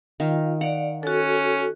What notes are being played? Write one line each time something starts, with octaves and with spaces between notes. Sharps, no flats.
D#3 F4 F5
D5 F5 F#5
C#4 F#4 A4